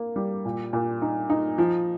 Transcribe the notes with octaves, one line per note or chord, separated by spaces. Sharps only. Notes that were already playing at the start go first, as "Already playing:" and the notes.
Already playing: A#3
G3
A#2
A#2
D#4
D#4
F3